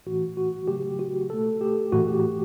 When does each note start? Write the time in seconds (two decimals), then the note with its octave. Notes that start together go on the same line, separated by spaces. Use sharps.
0.06 A2 E3 A3 F#4
0.37 F#4
0.68 C#3 F#3 A3 G4
0.99 F#4
1.30 B2 A3 A4
1.61 G4
1.92 A2 E3 A3 F#4
2.08 G4